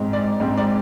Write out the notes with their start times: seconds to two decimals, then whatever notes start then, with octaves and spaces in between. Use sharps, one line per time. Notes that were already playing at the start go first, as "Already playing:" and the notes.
Already playing: G#2 G#3 C4
0.13 D5
0.40 G#2 G#3 C4
0.57 D5